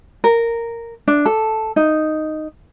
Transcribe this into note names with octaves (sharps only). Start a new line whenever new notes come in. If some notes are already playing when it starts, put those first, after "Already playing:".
A#4
D4
A4
D#4